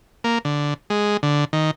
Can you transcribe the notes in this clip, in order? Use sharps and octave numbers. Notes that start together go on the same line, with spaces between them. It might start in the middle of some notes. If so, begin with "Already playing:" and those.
A#3
D3
G#3
D3
D#3